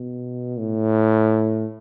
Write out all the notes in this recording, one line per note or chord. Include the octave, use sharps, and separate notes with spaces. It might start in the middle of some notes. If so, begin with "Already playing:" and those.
Already playing: B2
A2